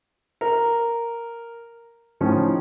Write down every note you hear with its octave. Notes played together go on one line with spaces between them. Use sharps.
A#4
A2 D#3 F3 C#4